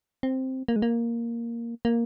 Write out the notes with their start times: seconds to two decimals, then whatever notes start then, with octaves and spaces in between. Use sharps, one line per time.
0.23 C4
0.68 A#3
0.76 G#3
0.82 A#3
1.85 A#3